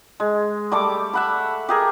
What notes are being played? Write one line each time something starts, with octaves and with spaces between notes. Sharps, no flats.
G#3
G3 A3 D6
E5 F#5 B5
G4 G#4 A#4